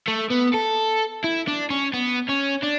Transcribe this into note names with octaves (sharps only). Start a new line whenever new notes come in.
A3
B3
A4
E4
D4
C#4
B3
C#4
D4